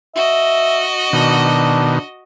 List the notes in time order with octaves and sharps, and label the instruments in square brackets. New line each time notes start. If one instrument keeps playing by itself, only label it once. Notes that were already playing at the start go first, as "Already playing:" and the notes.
[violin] F#4 D#5 [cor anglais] E5
[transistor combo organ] B2 D#3 [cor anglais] D4